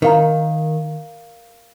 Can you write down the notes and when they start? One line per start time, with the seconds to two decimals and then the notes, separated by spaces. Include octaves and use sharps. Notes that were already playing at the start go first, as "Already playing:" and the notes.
0.02 D#3 A#4 F5 A#5